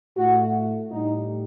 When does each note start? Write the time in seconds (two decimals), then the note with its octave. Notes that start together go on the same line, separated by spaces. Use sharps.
0.16 A2 A3 F#4
0.90 A2 G3 D#4